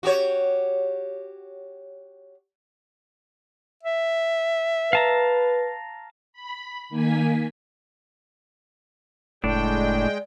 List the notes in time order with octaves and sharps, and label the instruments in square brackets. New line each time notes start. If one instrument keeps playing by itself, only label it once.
[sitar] F#4 G4 C#5
[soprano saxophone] E5
[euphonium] B4 [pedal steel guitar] F5 A5 A#5
[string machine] B5
D#3 A#3 G#5 B6
[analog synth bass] F#1 [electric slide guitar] A2 D4 [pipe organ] G#3 G5 [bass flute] D5